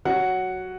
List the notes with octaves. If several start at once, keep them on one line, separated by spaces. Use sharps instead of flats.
F#3 F#5